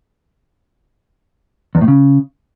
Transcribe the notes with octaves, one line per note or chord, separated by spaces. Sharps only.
E2
A2
C#3